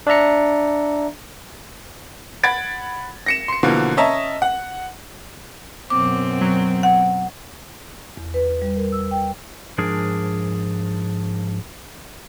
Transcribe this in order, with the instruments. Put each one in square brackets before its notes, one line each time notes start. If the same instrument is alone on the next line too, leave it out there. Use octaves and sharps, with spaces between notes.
[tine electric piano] D4 D5 E5 A#5 C#7
[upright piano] F#5 B5 G#6 A6 D7
A#6 C#7 E7
C6 C#7
B2 D3 E3 F3 A#3
C#4 D#5 E5 A5 A#5
F#5
[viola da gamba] F#2 B2 C4 [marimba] D6
[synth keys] F#3
[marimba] F#5
E2
B4
G3
A#4
E6
G5
[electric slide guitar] G#2 F3 D4 G#4 A#4